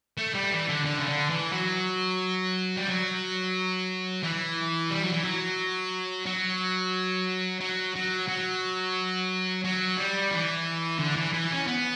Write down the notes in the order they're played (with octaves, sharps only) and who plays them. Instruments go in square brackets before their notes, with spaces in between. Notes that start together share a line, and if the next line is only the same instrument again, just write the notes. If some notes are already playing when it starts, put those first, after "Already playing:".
[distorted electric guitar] A3
G3
E3
D3
D3
C#3
D3
E3
F#3
G3
F#3
E3
G3
F#3
E3
F#3
F#3
F#3
F#3
F#3
F#3
G3
E3
D3
E3
E3
C#4
B3